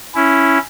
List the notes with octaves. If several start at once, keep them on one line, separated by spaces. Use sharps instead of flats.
C#4 E4